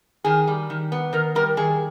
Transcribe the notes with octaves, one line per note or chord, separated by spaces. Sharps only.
D#3 G#4
G3
D#3
B3
D#3 A#4
G3 A#4
D#3 G#4